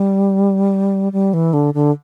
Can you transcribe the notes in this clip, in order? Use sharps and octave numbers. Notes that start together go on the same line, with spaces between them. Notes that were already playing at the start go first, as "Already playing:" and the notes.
Already playing: G3
G3
E3
D3
D3